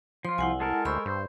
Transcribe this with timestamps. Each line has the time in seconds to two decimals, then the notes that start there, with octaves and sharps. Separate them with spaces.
0.25 F3 F4 C6
0.38 C2 E4 F#5 G#5
0.60 G#3 A4 A#4 A5
0.85 D2 C5 B5 C#6 E6
1.06 G2 C5